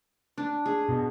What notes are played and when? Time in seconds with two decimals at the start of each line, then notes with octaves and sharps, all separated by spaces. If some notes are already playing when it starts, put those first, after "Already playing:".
0.38 D4
0.66 G#4
0.89 B2